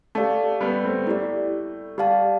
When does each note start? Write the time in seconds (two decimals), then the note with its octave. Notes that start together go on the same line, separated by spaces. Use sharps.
0.15 A3 G4 D5 F5 A5
0.61 G3 B3
0.83 A3 C4
1.07 A3 E4 G4 D5
1.98 G3 G4 D5 F5 A5